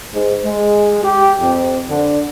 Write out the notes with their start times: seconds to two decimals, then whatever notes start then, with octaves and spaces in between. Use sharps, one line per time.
0.14 G#2
0.44 G#3
1.03 G4
1.40 F2
1.90 D3